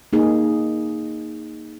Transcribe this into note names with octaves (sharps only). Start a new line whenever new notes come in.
A#3 D#4 G#4